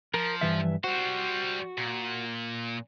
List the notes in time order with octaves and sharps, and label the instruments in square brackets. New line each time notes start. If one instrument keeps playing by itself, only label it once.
[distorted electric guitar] F3 [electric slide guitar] A#4
[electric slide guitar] G2 E3 E5
[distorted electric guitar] G3 C5 [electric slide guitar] F#4
[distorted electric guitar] A#2